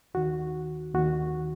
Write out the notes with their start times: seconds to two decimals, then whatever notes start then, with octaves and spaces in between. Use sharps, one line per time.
0.14 D#2 D#3 F#4
0.95 D#2 D#3 F#4